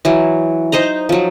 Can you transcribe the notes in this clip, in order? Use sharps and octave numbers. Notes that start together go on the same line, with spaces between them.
E3 F#3
D#4 C5 D#5 A#5
F3 F#3